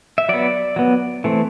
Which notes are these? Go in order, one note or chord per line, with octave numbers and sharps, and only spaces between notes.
E5
F#3 B3 D5
F#3 B3
E3 A3 C4